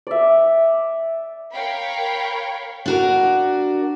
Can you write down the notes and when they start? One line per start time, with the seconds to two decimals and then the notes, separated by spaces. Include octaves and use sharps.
0.07 D5 E5
1.54 A#4 C#5 F5 G5 B5
2.86 D4 F#4 A#4